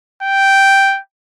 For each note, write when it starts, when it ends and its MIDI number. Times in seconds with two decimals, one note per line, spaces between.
0.23 0.99 79